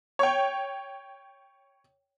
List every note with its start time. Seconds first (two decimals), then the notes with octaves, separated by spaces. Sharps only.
0.19 C#5 G5